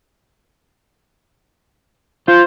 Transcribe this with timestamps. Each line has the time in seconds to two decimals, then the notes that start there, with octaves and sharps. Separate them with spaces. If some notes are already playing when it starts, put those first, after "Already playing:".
2.28 F4 C5